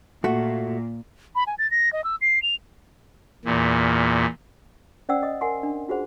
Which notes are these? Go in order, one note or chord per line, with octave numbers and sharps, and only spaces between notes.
A#2 A3 F#4
B5
G#5
A6
A#6
D#5
E6
C7
F7
E2 A#2
C#4 C5 D5 F#5 G5 E6
D#5 D#6
A#4 F#5 G#5 C6
D4
F4 F#4 G#4 C5 F#5